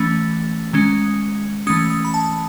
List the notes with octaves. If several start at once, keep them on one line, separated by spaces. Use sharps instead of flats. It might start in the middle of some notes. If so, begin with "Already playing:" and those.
Already playing: E3 A3 C#4
D#3 G#3 C#4
E3 A3 C#4 D#6
D#6
B5
A5